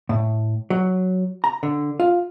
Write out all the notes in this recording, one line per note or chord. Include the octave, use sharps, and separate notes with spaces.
A2
F#3
A#5
D3
F4